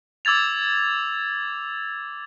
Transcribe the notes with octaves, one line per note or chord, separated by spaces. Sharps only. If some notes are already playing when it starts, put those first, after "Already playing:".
D6 E6 G#6 A6 F7